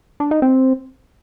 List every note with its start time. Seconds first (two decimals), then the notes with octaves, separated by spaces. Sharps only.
0.20 D4
0.31 D#4
0.42 C4